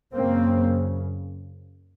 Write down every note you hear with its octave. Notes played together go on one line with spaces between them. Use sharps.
F#2 C#3 A#3 C4